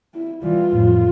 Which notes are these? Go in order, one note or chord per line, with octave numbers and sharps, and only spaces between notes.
E4
E3 G3 F4
F2 A2